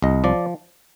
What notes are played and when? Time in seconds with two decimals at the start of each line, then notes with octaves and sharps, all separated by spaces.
0.02 C2 D#5
0.24 F3 D5